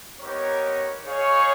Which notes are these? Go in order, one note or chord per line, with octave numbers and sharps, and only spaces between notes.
B3 D#4 G4 A#4 C#5
D#4 G#4 C#5 F5